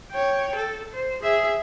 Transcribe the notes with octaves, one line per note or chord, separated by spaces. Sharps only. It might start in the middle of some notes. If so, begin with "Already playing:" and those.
C#5 G5
A4
C5
G#4 E5